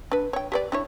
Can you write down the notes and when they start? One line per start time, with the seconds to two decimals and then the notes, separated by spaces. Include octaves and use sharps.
0.12 D4 B4
0.33 C#5 G5
0.52 G4 B4 D5
0.72 D4 E4 C#5